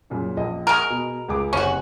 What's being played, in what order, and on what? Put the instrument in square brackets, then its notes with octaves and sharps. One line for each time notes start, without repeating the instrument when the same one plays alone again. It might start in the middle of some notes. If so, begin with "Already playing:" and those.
[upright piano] F#2 A#2 C#3
A#1 D#5
[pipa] G#3 A#4 [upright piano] F#5 C#6
[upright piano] B2
C#2 G#4 D6
[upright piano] F#1 C3 C5 [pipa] C#4 F#4